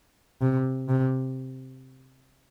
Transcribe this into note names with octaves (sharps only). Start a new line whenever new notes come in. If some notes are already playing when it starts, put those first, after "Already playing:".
C3
C3